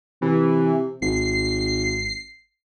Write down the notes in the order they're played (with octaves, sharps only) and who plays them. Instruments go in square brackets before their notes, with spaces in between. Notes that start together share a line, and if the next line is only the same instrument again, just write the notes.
[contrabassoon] C3 [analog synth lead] E3
[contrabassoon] G#1 [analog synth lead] C7